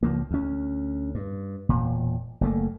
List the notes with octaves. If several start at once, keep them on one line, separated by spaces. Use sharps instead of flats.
C#2 F3 A#3
D2 C#4
G2
E1 A#2
F#1 A3 A#3